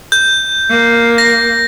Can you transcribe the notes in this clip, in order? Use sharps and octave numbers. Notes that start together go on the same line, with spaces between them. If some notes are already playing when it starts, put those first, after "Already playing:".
G6
A#3
A#6